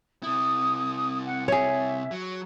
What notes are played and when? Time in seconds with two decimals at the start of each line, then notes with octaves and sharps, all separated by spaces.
0.23 C3 E4 D#6
1.25 F#5
1.48 G#4 C#5 E5
2.11 F#3